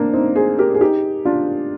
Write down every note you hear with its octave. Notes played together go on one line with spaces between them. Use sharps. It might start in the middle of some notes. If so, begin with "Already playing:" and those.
Already playing: A#3 C4 D4
C4 D#4
G#4 C5
G4 A#4
G#4
D#4 G4
D4 F4